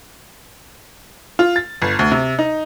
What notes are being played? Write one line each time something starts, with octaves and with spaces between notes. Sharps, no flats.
F4
A6
G1
D2
C3
D#4